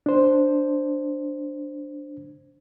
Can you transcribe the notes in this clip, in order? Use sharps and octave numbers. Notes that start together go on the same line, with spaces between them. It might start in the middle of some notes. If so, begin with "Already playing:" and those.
D4 C5